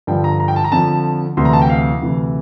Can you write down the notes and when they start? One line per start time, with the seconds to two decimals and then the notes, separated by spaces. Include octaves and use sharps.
0.07 G2 D3 F3 G5
0.24 A#5
0.40 A#5
0.48 G5
0.56 A5
0.64 A#5
0.72 F2 D3 F3 A5
1.37 D2 C3 E3 C6
1.45 A#5
1.53 A5
1.62 G5
1.69 F5
2.02 D2 C3 E3